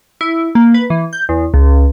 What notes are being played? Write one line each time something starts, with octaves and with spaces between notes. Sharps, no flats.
E4
A#3
B4
E3
G6
E2
C#2